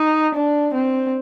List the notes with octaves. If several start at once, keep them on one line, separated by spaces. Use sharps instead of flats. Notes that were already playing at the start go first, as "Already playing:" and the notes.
Already playing: D#4
D4
C4